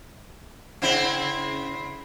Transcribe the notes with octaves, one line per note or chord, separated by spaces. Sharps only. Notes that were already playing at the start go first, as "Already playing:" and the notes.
C#3 C4 E4